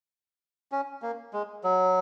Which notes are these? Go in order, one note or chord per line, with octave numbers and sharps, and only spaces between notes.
C#4
A#3
G#3
F#3